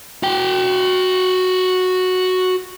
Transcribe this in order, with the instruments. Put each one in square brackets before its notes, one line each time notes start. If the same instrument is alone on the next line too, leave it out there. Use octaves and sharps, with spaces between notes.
[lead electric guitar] F#4 G5